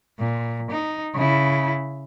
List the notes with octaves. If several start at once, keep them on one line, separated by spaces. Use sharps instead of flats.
A#2
D#4
C#3 E4